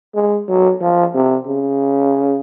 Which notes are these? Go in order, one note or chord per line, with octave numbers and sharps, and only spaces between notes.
G#3
F#3
F3
C3
C#3